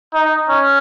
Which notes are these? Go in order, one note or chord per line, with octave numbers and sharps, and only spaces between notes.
D#4
C#4